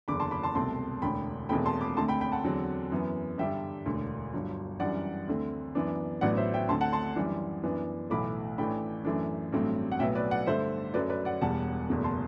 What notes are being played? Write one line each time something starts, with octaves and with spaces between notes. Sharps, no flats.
F#1 E2 D3 B5 D6
A5 C6
B5 D6
A5 C6
C2 B2 A3 C4 A5 C6
E1 D2 D3 G5 B5
E1 E2 B2 A3 C4 G5 B5
A5 C6
B5 D6
D2 D3 A3 C4 A5 C6
G5 B5
G5 B5
F#5 A5
E2 D3 F#3 C4
F#2 E3 B3
G2 D3 G3 D4 E5 G5
E1 D2 D3
G1 G2 F#3
F#2 E3 G3 D4 D5 F#5
D2 D3 A3 C4
F#2 E3 B3 D4
A1 A2 F#3 B3 D4 D5 F#5
C5 E5
E5 G5
D2 D3 A3 C4 A5 C6
F#5 A5
A5 C6
F#2 E3 G3 D4
F#2 E3 B3 D4
B1 A2 E3 A3 B5 D6
A1 A2 E3 A3 D4 G5 B5
F#2 E3 A3 D4
A1 G2 F#3 A3 C4
F#5
B1 A2 F#3 B3 E5 G5
B4 D5
D5 F#5
G2 D3 A3 C5 E5
F#2 F#3 A3 B4 D5
B4 D5
D5 F#5
E1 E2 B2 G3 F#5 A5
F#1 E2 B2 A3
A5 C6